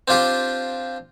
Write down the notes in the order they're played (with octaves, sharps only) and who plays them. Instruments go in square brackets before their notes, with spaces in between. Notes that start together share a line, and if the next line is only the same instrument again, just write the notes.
[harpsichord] C4 D4 F4 G4